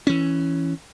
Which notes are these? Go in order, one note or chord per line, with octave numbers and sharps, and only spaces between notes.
E3 C#4